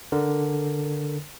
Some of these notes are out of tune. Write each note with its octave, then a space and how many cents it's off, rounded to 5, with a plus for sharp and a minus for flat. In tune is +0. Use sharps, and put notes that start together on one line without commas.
D3 +0 A#4 +0